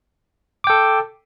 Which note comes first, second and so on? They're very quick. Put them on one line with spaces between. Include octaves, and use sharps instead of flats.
D6 G5 A4